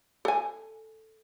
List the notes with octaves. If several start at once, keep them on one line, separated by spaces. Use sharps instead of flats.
A4 G#5